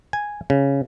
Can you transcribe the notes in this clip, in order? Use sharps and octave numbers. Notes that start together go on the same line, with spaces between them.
G#5
C#3